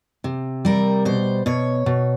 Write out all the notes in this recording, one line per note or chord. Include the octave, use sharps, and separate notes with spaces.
C3
G3 A#4
B2 C5
B2 C#5
B2